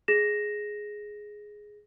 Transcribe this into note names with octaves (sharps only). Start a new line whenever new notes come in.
G#4 A#6 E7